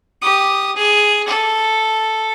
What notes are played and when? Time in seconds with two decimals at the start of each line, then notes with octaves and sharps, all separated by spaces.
0.22 G4 D#6
0.76 G#4
1.28 A4